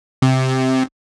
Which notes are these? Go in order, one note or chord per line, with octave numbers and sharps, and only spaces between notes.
C3